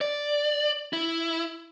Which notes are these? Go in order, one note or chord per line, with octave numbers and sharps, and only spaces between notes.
D5
E4